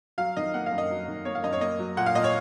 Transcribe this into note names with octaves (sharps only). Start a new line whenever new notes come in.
F#3 F5
D#3 D#5
A#3 F#5
F5
F#2
D#5
F#3
D#3
A#3 C#5
F5
F#2 D#5
C#5
A#3 D#5
F#3
A#2 F#5
F5
A#2 D#5
C#5